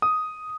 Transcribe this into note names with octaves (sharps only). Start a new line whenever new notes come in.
D#6